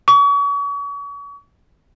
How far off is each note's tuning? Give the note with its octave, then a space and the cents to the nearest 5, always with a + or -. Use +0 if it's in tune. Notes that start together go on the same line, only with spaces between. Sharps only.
C#6 +40